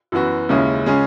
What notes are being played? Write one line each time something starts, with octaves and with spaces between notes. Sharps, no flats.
F#2 E3 B3 F#4
D#2 C#3 G#3 C#4 E4
C#3 G#3 C#4